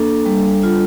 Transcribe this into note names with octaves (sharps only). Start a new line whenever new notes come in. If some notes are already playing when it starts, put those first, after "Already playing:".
Already playing: A#3 D4 A4
G3
F4